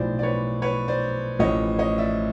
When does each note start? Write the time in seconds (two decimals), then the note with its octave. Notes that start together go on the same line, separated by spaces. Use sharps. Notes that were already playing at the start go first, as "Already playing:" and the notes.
Already playing: B1 A2 F3 C5 D5
0.19 D5
0.23 B4 C#5
0.62 B4 C#5
0.88 C5 D5
1.39 A1 A2 F3 C#5 D#5
1.79 C#5 D#5
1.98 D5 E5